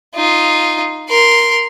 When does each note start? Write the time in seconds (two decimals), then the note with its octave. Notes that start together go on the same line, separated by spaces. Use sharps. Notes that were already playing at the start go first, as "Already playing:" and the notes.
0.15 D#4 F4
1.09 A#4 C6